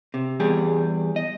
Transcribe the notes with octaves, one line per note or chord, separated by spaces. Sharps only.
C3
E2 G3 G#4
D#5